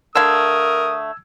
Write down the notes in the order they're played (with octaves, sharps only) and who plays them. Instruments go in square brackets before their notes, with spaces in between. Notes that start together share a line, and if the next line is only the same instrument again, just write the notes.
[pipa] D3 A3 F5 [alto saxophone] A#4 [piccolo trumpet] D#6 [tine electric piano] E6 G#6